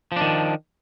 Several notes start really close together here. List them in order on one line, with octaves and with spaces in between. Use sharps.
F3 D4 D#3